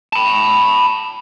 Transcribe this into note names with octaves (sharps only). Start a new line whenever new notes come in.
A5 B5